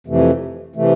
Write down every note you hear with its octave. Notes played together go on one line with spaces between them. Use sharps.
F2 C3 E3 A3
C3 E3 A3